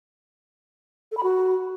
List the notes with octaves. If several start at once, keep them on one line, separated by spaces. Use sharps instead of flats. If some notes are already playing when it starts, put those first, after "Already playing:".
A4
B5
F#4